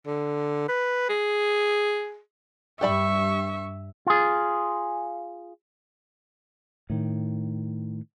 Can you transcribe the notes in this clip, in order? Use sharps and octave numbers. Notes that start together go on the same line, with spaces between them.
D3
B4
G#4
G2 G4 D5 E5 B5 C#6
F4 G#4
A2 D#3